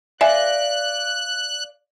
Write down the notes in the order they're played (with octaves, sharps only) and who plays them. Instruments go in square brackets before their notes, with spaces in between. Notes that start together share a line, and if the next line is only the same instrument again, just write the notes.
[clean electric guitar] D5 F5 [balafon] E5 G#5 [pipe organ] F#6